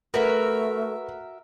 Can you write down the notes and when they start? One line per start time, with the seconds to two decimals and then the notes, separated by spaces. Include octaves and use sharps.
0.14 A3 F#4 A#4 B4 E5